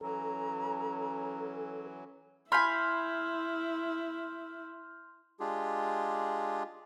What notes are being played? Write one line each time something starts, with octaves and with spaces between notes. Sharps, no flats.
E3 F#3 C#4 A4 A#5
E4 G#5 B5 C6 F6 G6
G#3 D4 F4 G4 G#4